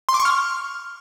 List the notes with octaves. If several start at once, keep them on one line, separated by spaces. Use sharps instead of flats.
C6
D6
C#6
F6